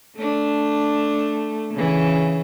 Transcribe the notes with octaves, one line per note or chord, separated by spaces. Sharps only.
A3 D4
C#3 E3